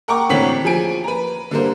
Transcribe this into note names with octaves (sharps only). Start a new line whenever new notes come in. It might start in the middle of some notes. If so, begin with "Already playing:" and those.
A#4 F#5 G5 A#5 C#6 D6
A1 D3 C4 C#5 B6 F#7
F3 G#4 G#5 D7
B4 A#5
D3 G3 A#3 A#4 C5